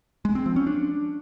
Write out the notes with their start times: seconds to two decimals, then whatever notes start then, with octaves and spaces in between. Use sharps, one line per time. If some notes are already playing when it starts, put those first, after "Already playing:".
0.25 G#3
0.35 C4
0.46 F3
0.56 C#4
0.67 D4